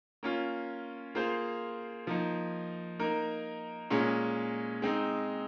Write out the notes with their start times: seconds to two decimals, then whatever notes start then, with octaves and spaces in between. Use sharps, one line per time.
0.23 A#3 C#4 F4
1.15 A#3 F4 G#4 C5 F5
2.07 F3 A#3 D#4
2.99 A#3 D#4 A#4
3.91 A#2 G#3 C#4
4.82 G#3 C4 D#4